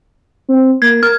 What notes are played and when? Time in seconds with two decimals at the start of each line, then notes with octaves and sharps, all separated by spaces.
0.49 C4
0.82 A#3 G#6
1.03 A#4 F6